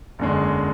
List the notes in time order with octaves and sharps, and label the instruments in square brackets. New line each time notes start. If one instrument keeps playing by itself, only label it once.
[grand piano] F#1 E2 D3 G#3 C#4